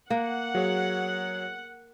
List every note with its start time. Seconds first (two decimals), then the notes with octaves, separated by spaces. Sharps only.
0.10 A#3 F#5
0.55 F#3 G#4 C#5